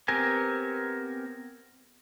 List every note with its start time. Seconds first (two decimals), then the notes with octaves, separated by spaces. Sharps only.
0.08 B3 C4 G4 A#4 G#5